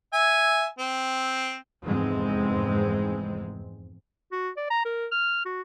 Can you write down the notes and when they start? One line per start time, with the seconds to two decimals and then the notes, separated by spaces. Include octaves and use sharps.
0.13 E5 G#5
0.79 C4
1.84 F1 E2 G#2 G#3 C4
4.32 F#4
4.57 D5
4.70 A#5
4.85 A#4
5.12 F6
5.46 F#4